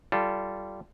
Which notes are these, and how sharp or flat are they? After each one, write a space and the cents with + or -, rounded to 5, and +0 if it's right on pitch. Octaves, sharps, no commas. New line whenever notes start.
G3 -15 F4 -25 A4 +0